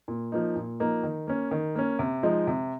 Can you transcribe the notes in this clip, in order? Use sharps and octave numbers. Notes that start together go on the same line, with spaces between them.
A#2
F3 A#3 D#4
A#2
F3 A#3 D#4
D#3
A#3 C#4
D#3
A#3 C#4
C3
F3 G#3 D#4
C3